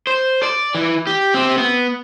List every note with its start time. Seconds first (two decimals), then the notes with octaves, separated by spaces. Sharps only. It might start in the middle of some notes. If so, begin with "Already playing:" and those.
0.07 C5
0.43 D5
0.75 E3
1.07 G4
1.34 C4 G4
1.58 B3